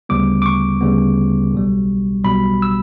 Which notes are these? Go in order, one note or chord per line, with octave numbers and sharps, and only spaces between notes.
D2 C#3 G3 B3 D6
D6
C#6
D2 C#3 G3 B3
B1 B2 G3
B1 B2 G3 B5
E6